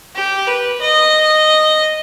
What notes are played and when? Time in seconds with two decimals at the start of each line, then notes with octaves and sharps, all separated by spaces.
0.15 G4
0.47 B4
0.81 D#5